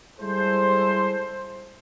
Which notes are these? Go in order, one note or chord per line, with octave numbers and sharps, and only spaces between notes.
G3 G#3 E4 A4 C5